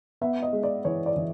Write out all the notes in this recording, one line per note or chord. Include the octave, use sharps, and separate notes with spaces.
B3 E5
D#5
G#3
D5
E3 C#5
D5
E3